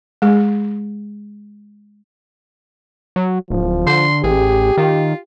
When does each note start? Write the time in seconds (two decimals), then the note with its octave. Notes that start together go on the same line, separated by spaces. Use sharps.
0.22 G#3 G#4
3.16 F#3
3.50 D1 F3
3.87 D3 C6
4.24 A1 G4 G#4
4.77 D#3 F4